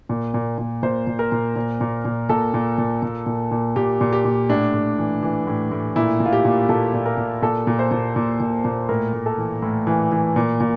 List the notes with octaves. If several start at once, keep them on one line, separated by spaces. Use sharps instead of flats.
A#2
A#2
A#2
A#2 C5
A#2
A#4
A#2
A#2
A#2
A#2
A#2 A4
A#2
A#2
A#2
A#2
A#2
A#2 G4
A#2
G4
A#2
A2 D4
A2
E3
E3
A2
A2
A#2 E4
A#2
F4
G4
A#2
A#2 A4
A#2
A#4
A#2
A#2 A4
A#2
C5
A#2
A#2
A#2
A#2
A2 A#4
A2
A4
E3
A2
E3
E3
A#2
A#2